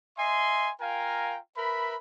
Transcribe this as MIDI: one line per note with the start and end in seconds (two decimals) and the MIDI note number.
0.18 0.71 75
0.18 0.71 76
0.18 0.71 80
0.18 0.71 84
0.81 1.37 65
0.81 1.37 70
0.81 1.37 77
0.81 1.37 79
0.81 1.37 80
0.81 1.37 82
1.56 1.96 70
1.56 1.96 71
1.56 1.96 76
1.56 1.96 83